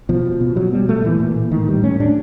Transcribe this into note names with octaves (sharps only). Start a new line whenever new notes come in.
B2 F3
B2
B2
B2 F#3
B2 G3
A#2 A3
A#2 E3
A#2
A#2
A2 D#3
A2 G3
A2 C#4
A2 D4